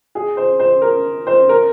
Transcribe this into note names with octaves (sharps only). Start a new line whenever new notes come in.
G#4
C5
C5
A#4
C5
A#4